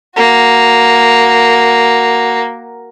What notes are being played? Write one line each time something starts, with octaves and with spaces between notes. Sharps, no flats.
A#3 F#4